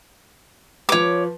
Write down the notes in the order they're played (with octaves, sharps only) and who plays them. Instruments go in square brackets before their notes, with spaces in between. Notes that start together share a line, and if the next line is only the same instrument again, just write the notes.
[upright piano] F3 B4 [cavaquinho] C#5 D6